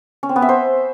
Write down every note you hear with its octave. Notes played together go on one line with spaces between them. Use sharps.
C#4
C4
B3
E5
C5